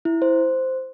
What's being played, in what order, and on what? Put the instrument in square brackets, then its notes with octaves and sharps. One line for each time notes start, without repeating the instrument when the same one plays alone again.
[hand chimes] E4
C5